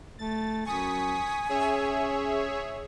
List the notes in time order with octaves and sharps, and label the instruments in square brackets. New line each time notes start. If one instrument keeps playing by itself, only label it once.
[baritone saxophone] A3 [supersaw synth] A6
[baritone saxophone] F#2 [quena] G#5 [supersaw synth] C#6 D#6 B6
[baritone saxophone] C#4 [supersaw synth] G#4 C#5 E5